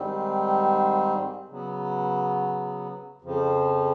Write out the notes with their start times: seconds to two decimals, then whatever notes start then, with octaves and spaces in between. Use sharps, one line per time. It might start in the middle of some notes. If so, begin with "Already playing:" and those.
Already playing: G#2 D#3 G3 C4
1.49 C#3 F#3 B3
3.22 F2 C#3 F3